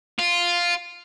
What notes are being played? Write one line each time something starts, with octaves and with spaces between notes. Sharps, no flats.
F4